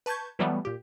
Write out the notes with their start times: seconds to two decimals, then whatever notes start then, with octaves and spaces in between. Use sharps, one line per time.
0.06 B4 A5 C#6 G6 G#6
0.39 E3 F#3 G3 A3 B3
0.65 A#2 G4